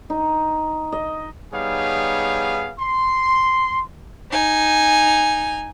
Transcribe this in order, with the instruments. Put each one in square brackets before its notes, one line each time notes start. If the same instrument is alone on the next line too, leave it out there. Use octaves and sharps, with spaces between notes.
[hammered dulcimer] D#4
D#5
[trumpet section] G3 B3 D#4 G#4 C#5 F5
C6
[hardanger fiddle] D#4 G#5